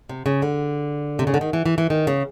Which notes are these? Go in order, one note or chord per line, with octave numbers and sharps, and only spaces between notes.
C3
C#3
D3
C3
C#3
D3
D#3
E3
E3
E3
D#3
C#3